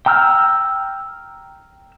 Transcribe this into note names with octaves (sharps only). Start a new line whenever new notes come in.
G5 A#5 E6 F6 G6